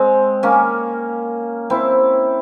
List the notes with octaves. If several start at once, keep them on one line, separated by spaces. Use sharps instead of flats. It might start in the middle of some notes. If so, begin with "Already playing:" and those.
Already playing: G#3 C4
A#3 C#4
C4 E4